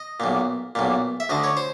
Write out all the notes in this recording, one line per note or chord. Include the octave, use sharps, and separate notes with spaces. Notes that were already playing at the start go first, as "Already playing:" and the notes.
Already playing: D#5
B1 A#2
B1 A#2
E5
D2 D3 D#5
C#5
C5